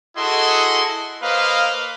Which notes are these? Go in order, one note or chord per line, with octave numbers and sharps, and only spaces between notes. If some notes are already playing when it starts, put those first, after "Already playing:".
E4 F#4 G#4 A4 D#5 C6
A#3 B4 C5 D#5 F5